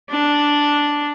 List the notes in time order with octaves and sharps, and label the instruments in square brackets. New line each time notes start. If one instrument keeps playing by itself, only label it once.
[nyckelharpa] D4